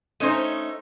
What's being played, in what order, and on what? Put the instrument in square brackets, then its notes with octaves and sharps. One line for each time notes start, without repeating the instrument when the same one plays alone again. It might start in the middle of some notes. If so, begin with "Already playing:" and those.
[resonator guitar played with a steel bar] A3 C#4 D#4 [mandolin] C5 D#5